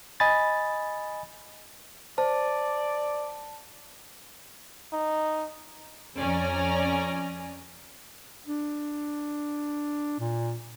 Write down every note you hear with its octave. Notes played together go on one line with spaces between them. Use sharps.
D#5 G#5 B5 A6
C5 D5 A5
D#4
F2 C#4 D5 G#5 A#5
D4
A#2